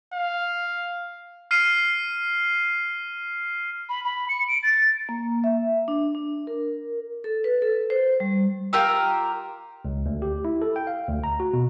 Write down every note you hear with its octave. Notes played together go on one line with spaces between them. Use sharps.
F5
F6 C7 D#7
B5
B5
C#7
D7
A6
A#3
E5
D4
D4
A#4
A4
B4
A4
C5
G3
F4 G4 A#4 E6
C#2
D2
G4
E4
A4
G5
F5
D2
A#5
F#4
B2